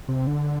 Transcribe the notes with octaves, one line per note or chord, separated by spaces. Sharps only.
C3
D3